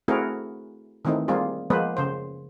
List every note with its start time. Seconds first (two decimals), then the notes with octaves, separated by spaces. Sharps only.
0.08 A3 C4 E4 F#4 G#4 A#4
1.05 D#3 E3 A3 C4 D#4
1.28 G3 A#3 C4 F4 G#4
1.70 F3 G#3 A#3 B3 B4 C5
1.97 C#3 C5